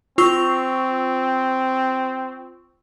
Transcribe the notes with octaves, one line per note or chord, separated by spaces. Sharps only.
C4 F4 C#6 E6